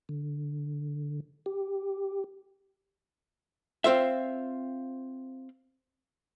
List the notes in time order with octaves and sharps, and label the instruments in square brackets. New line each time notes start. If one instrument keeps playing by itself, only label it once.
[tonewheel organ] D3
G4
[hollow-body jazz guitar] C4 F4 C5 E5